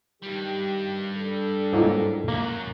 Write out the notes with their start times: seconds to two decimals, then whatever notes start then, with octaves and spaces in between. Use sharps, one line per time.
0.22 G2 D#3 G3 G4
1.18 D4 A4
1.73 G#2 F#3 G#3 A#3 E4 F4
2.28 F#2 F#3 A#3